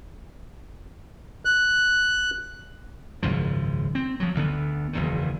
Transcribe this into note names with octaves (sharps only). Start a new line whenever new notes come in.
F#6
G#1 C#2 F#2 F3
C4
F3 F#3
D2 D3 B3
F#1 E2 D#3